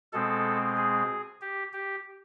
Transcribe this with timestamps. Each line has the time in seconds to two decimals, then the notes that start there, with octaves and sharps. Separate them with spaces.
0.13 B2 G#3 C4 A4
0.77 G#4
1.41 G4
1.73 G4